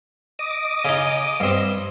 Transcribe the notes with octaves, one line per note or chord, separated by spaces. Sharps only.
D#5 D6 D#6
C#3 D#4
G2 C4